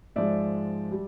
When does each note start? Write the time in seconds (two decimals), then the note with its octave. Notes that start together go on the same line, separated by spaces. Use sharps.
0.16 G#2 F3 G#3 D5 E5
0.92 G3